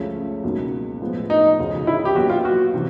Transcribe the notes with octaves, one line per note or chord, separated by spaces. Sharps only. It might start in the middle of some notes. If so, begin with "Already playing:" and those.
Already playing: C#2 C#3 F3 A3
C#2 B2 F#3 A#3 D#4
A2 F3 G#3 B3
D#4
D2 C#3 F3
E4
G4
A#2 F#3 B3 F#4
F4
F#4
C3 E3